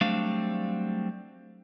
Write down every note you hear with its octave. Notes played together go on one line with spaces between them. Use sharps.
F#3 G3 A3 C4 D4 F5